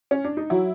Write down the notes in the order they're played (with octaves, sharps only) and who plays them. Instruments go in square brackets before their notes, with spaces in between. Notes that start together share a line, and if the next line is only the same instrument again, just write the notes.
[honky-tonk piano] C#4
D4
D#4
[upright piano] F#3 [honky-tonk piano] E4